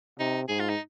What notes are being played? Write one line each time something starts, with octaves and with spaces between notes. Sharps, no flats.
C3 D#4
G#2 G#4
F4
D#4